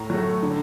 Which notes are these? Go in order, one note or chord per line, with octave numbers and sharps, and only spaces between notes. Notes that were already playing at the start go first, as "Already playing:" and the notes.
Already playing: A2 A#5
F#3 A3
D3